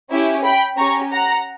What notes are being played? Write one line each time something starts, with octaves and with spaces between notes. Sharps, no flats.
C#4 E4 G4
G5 B5
C#4 G4 A#5 C#6
F#5 A#5